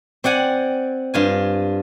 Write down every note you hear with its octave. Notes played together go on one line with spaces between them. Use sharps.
C4 D5 F#5 G#5
G2 F4 G#5